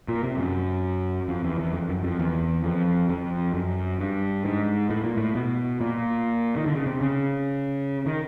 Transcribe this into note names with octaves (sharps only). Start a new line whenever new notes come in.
A#2
C3
F#2
F2
E2
E2
F2
F#2
F2
E2
F2
F2
F#2
G2
G#2
A2
A#2
A2
B2
A#2
D#3
D3
C#3
C3
C#3
D#3